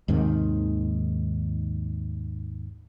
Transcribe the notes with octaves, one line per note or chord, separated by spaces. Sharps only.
D#2 G#2 C3 D#3